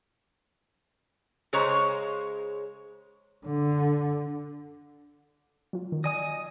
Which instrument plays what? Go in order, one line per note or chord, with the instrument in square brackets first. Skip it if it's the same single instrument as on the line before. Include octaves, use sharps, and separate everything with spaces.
[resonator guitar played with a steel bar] C#3 G#3 C5 C#5 A#5
[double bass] D3
[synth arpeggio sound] F#3 F4
D#3
[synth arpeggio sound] D5 [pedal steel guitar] D#5 G#5 D#6